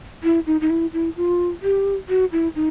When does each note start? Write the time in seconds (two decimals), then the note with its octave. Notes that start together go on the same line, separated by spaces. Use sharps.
0.23 E4
0.47 D#4
0.61 D#4
0.70 E4
0.93 E4
1.17 F4
1.63 G4
2.09 F#4
2.32 E4
2.55 D#4